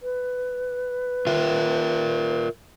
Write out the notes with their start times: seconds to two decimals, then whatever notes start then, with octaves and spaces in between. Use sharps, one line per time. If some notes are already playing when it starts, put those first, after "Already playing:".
0.01 B4
1.27 F4 A#4 E5